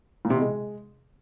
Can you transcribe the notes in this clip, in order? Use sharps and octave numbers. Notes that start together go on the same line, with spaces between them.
A#2
C3
B2
G#3